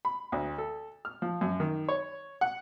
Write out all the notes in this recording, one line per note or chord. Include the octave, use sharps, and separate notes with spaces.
B5
D2
A4
F6
F3
F#2
D#3
C#5
F#5